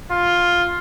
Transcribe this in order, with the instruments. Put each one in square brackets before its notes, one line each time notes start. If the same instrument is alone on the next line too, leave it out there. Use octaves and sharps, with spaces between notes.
[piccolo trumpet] F4